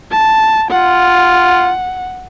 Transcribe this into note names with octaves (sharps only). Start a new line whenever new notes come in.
A5
F4 F#5